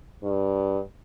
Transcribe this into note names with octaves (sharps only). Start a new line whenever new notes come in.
G2